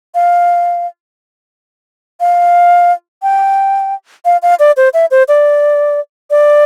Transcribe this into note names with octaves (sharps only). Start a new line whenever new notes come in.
F5
F5
G5
F5
F5
D5
C5
E5
C5
D5
D5